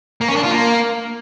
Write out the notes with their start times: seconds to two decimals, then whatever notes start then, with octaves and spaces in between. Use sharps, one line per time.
0.21 A#3
0.28 C#4
0.36 D4
0.43 F4
0.51 A#3